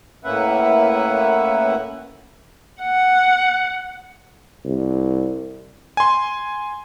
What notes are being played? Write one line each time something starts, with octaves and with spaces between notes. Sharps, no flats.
A2 A#3 C#4 B4 E5 F#5
F#5
C2
G#5 C6